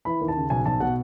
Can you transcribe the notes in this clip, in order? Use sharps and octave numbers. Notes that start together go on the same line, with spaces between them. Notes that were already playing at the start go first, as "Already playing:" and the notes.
E3 B5
D#2
A5
C#3
B1 G#5
B1 A5
B2 F#5